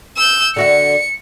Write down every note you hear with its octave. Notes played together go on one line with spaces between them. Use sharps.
E6 G6
D3 F#4 E5 C#7